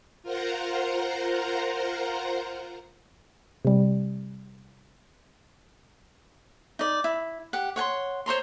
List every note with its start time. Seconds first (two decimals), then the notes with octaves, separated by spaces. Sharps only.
0.23 F4 A#4 C5 F#5 A#5
3.65 C3 G3
6.79 D#4 D5
7.04 E4
7.53 G4 F#5
7.76 C#5 F#5 G#5 C6
8.26 C5 C#5 A#5 C6